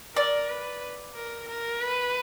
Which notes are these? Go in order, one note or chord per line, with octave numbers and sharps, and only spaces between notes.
A#4 D5
B4
A#4
A#4
B4